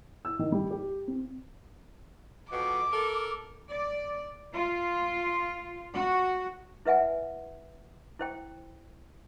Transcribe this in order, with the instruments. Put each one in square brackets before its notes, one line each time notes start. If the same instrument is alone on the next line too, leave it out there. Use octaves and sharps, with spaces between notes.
[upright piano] E6
D#3
G3
G4
C4
[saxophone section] F2 B2 [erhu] D6
[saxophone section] A4 A#4
[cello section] D5
F4
F#4
[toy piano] E4 B4 E5 F#5 G#5
E4 C5 G5